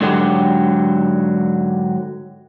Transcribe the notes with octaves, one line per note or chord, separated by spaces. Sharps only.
G#2 D3 F#3 G4